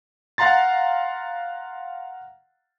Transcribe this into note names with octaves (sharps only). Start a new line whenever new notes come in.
F5 F#5 A#5 C6 A6